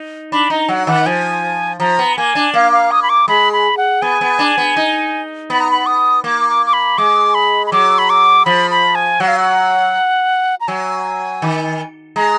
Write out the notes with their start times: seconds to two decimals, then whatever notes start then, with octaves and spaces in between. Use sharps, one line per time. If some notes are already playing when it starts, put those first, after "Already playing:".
Already playing: D#4
0.32 D4 B5
0.50 D#4 A#5
0.69 F#3 F#5
0.87 D#3 F#5
1.06 F3 G#5
1.80 F3 A#5
1.99 B3
2.17 A#3 G#5
2.35 D4
2.54 A#3 F5
2.72 F5
2.91 D#6
3.03 B5
3.09 D6
3.28 G#3 B5
3.53 B5
3.77 F#5
4.02 B3 G#5
4.21 B3
4.39 D4
4.58 B3
4.76 D#4
5.50 B3 B5
5.60 A#5
5.71 B5
5.87 D#6
6.24 A#3 D6
6.49 D6
6.66 D6
6.73 B5
6.98 G#3 D6
7.34 B5
7.67 B5
7.72 F#3 D6
7.99 B5
8.10 D6
8.45 F3 B5
8.71 B5
8.95 G#5
9.20 F#3 F#5
9.28 F5
9.36 F#5
10.61 A#5
10.68 F#3 G#5
11.42 D#3
12.16 G#3 A#5